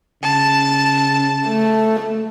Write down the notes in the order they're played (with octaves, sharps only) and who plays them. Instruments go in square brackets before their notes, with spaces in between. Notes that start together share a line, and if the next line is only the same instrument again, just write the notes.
[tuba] C#3 [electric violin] A5
[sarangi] A3